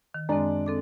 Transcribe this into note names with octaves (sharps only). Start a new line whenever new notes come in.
D#3
F#2 G#3 C4 D4 D5
C4 A4 D6